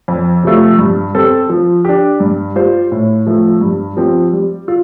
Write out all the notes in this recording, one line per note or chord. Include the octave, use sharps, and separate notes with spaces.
F2
C3 F3 A3 F4
G2
G3 C4 A4
F3
D4 G4
G2
G3 F4 C5
A2
F3 A3
G2
F3 C4 G4
G3
F4